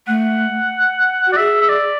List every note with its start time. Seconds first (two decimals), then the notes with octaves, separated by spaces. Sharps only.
0.07 A3 F#5
1.26 F#4
1.32 D5
1.37 G#4 E5
1.61 E5
1.69 D5